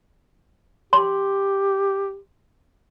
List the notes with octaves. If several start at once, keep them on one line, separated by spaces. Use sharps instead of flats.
G4 C6